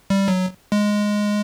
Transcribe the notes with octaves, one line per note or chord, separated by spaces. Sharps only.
G3
F#3
G#3